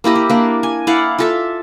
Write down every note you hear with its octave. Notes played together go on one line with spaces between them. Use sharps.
A#3 E4 G4 D#5
E4
A#3 D4
G#5
E4 D5 F5 F#5
F4 A4 E5